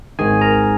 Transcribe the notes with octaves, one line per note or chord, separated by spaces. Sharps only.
G#1 G#2 D#3 G#4 G#5
A#4 A#5